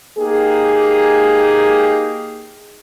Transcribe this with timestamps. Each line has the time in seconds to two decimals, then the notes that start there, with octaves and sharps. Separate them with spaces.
0.18 A#3 D#4 G4 G#4